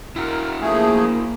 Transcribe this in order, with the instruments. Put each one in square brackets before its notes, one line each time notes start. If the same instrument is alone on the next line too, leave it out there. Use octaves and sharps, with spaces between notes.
[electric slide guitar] E4 F#4 [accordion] A#4
[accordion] F3 A3 G#4 [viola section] A#3